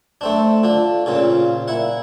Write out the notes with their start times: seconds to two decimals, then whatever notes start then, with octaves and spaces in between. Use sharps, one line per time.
0.21 A3 C4 D4
0.63 D3 D4 F4
1.06 A#2 C#3 C4 F4
1.68 A#2 E4 F#5